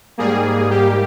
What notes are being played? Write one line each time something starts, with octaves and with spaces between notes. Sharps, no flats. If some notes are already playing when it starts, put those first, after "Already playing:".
G#2 G3 A#3 G#4
G4